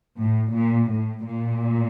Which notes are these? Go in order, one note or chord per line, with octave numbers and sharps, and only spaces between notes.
A2
A#2
A2
A#2